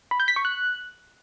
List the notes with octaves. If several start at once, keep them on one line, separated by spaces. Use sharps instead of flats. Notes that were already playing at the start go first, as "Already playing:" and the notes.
B5
G6
B6
C#6
F#6